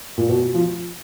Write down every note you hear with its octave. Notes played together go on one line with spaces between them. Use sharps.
A#2
B2
F3